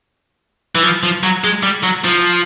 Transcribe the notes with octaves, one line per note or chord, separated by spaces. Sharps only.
E3
F3
F3
F#3
G#3
G3
F#3
F3